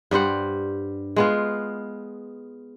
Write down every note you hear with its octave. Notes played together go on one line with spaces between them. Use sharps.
G2 G3 C5 F#5
G#3 B3 F4